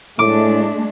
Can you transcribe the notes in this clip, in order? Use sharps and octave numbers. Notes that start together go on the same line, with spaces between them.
A2 G#3 A3 D4 D6